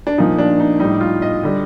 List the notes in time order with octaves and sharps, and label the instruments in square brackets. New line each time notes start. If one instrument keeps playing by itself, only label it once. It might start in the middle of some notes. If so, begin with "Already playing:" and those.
[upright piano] D4
A#2 F3 D#4
D4
D#4
A2 G3 D#4
F4
D#5
D3 G3